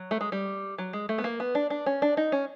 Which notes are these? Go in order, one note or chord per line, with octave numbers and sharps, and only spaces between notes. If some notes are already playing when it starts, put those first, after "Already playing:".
Already playing: F#3
A3
G#3
G3
F#3
G#3
A3
B3
A#3
B3
D4
D4
C#4
D4
D#4
C#4